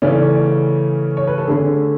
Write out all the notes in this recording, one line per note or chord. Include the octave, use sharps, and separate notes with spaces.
C#3 E3 A3 C#4 D5
C#5
B4
A4
D3 A3 C#4 G#4